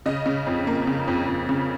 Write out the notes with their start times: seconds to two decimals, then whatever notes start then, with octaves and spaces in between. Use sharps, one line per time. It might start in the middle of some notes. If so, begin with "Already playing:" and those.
0.06 C#3 D#5
0.26 C#3
0.47 F2
0.67 A#3
0.87 C#3
1.08 F2
1.27 F2
1.49 C#3